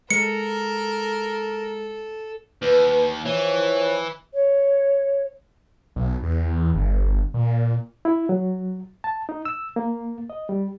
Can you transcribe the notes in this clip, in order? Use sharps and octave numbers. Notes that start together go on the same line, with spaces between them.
G#3 A4 A#4 C#7
D#2 B4
E3 F3 C#5
C#5
B1
E2
G1
A#2
E4
F#3
A5
D#4
E6
A#3
D#5
G3